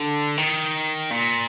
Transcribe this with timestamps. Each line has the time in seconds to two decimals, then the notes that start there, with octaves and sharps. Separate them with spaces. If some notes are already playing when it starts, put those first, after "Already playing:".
Already playing: D3
0.37 D#3
1.11 A#2